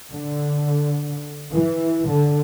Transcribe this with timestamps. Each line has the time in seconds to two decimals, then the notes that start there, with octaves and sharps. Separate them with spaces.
0.12 D3
1.53 E3
2.09 D3